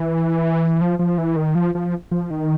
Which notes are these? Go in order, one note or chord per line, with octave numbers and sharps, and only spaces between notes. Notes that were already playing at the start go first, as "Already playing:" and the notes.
Already playing: E3
F3
F3
E3
D#3
F3
F3
F3
D#3